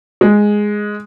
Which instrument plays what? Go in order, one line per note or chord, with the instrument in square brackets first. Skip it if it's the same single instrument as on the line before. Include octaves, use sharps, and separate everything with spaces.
[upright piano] G#3